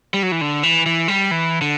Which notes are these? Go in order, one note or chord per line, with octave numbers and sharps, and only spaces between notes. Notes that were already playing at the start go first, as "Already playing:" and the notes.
G3
F#3
E3
D3
E3
E3
G3
E3
D3